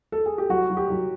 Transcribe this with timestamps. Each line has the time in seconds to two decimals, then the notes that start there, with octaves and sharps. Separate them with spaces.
0.12 A4
0.26 G#4
0.38 G4
0.49 F#3 F#4
0.70 F#3
0.77 G4
0.90 F#3